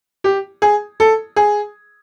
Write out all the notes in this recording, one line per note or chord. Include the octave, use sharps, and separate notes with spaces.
G4
G#4
A4
G#4